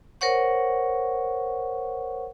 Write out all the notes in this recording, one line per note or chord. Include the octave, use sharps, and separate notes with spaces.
A#4 C5 C#5 F#5 C#6